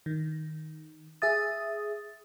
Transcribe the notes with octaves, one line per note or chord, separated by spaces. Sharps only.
D#3
G#4 E5 D#6 A6